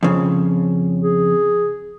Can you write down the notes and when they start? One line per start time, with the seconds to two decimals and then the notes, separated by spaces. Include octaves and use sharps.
0.03 F2 C#3
1.00 G#4